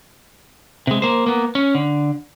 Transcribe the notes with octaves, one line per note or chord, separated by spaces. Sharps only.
C3 G#3
A#3 C5
A#3 B3
C#4
D3